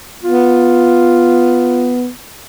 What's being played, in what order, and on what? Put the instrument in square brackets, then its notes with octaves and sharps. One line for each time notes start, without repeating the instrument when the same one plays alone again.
[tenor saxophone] B3 [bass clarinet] F4